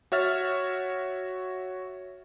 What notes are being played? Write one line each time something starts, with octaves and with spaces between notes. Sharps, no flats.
F#4 C#5 E5 F6 A6